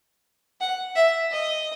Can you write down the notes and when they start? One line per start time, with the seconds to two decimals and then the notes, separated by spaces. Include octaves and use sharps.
0.60 F#5
0.95 E5
1.31 D#5